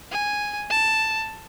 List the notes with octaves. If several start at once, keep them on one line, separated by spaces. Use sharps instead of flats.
G#5
A5